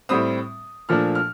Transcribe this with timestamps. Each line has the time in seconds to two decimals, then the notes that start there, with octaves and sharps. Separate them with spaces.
0.09 A2 G3 C4 D#6
0.89 A#2 F3 A3 D4 F6
1.15 F6